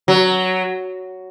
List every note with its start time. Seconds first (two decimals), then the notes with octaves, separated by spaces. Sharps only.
0.08 F#3